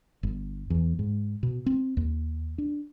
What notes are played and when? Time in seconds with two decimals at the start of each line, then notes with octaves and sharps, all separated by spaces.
0.23 G1
0.70 E2
0.99 G#2
1.43 B2
1.66 C4
1.97 D#2
2.58 D4